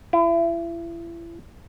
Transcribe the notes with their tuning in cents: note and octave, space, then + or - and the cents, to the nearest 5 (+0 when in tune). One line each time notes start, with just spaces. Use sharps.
E4 +35